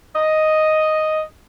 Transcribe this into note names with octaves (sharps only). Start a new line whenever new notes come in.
D#5